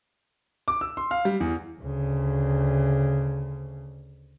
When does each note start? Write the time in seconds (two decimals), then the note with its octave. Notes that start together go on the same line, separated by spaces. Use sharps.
0.68 D6
0.81 E6
0.97 C6
1.11 F5
1.25 G3
1.40 E2
1.80 D2 C#3